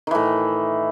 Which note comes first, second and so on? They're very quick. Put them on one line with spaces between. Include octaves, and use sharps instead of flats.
D#3 E3 A2